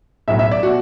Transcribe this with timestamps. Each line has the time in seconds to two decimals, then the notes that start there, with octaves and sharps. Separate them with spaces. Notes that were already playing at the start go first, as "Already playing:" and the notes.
0.28 B1 A2 F#3 E5
0.39 E5
0.51 D5
0.63 B2 F#4